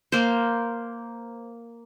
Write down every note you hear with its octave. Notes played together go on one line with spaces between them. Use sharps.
A#3 C5